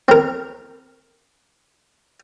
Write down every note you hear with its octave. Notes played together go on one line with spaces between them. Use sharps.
C4 A#4